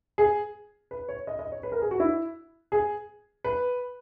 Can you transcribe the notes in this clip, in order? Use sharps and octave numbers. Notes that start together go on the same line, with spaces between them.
G#4
B4
C#5
D#5
D#5
C#5
B4
A#4
G#4
F#4
E4
G#4
B4